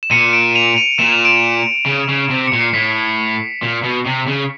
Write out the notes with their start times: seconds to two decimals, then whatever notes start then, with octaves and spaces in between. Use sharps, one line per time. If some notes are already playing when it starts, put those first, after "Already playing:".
0.03 E7
0.11 A#2 C#7 D#7
0.33 D7 E7
0.55 D#7 F7
0.77 D#7 F7
0.99 A#2 E7
1.12 F7
1.25 D7 E7
1.86 C#3
2.09 C#3
2.30 C3
2.47 C#7
2.53 A#2
2.61 C7
2.74 A2 B6
3.62 A#2
3.83 B2
4.06 C3
4.27 C#3